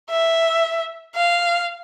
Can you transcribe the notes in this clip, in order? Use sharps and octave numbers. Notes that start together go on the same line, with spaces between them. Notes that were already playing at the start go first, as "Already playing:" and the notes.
E5
F5